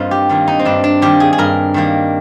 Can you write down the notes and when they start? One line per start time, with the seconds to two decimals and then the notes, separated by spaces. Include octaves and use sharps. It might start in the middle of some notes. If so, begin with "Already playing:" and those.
Already playing: G2 A#3 C4 D#4 F4
0.11 G4
0.29 D#3 G3 A#3
0.48 D#4
0.59 C4
0.65 G2 D4
0.84 D4
1.02 D#3 G3 A#3 G4
1.20 G#4
1.33 G#4
1.38 G2 A#4
1.74 D#3 G3 A#3